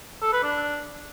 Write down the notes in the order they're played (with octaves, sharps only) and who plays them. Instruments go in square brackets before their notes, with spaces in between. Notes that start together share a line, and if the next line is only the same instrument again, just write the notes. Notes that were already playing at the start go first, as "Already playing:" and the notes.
[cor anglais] A4
B4
D4